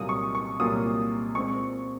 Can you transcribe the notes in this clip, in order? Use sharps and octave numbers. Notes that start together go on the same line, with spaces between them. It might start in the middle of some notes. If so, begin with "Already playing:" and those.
Already playing: C2 A#2 F#3 A#3 D#6
C#6
C#6
C2 A#2 F#3 A#3 D#6
A#2 G#3 C4 C#6